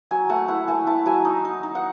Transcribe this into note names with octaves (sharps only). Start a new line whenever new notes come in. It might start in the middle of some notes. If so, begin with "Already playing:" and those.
F#3 G#5
A3 F#5
E4 F#5
A3 G#5
E4 A5
F#3 G#5
D#4
D#4
D#4
F#5